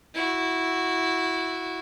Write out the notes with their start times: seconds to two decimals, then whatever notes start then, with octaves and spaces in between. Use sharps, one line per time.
0.14 E4 F#4